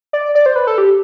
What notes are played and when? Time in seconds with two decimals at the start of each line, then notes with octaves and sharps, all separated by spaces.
0.13 D5
0.35 D5
0.46 C5
0.56 B4
0.67 A4
0.78 G4